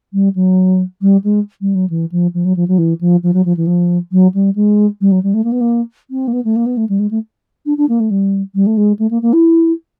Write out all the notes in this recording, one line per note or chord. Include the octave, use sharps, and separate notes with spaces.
G3
F#3
G3
G#3
G3
F#3
E3
F3
F3
F#3
F3
F#3
E3
F3
F3
F#3
F3
E3
F3
F#3
G3
G#3
G3
F#3
G3
A3
A#3
B3
A#3
C4
A#3
B3
A3
A#3
B3
A3
G3
G#3
A3
D4
D4
A#3
A3
G3
G3
A3
G#3
A3
A#3
A#3
E4